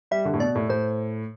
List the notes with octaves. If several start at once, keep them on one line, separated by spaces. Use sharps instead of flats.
G3 E5
D3
A2
B2 D5
A2
A2 C5